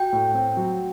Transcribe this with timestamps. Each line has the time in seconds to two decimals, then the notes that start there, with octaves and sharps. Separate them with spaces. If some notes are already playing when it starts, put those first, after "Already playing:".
Already playing: F#4 G5
0.13 A2
0.35 C4
0.57 F#3